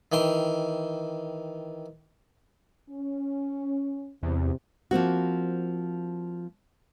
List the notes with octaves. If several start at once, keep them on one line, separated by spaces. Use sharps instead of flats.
D#3 E3 G5 C6
C#4
E2 C3
F3 A#3 C4 F#4